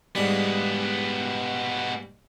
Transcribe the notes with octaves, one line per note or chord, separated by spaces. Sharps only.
G#2 G3 G#3 B3